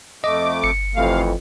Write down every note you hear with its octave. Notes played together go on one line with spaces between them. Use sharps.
F2 A3 D#5 D6
G1 C#7
F2 C3 E3 A3 F5